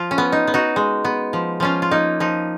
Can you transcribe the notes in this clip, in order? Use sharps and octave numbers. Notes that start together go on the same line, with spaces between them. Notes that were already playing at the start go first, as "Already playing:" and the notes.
Already playing: F3 F4
C#4
B3
D#4
B3
D#4 F#4
G#3
B3
F3
F3 C#4 F4
F4
A#3 D#4
F3 D#4